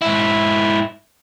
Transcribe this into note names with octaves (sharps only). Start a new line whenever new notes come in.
G#2 E4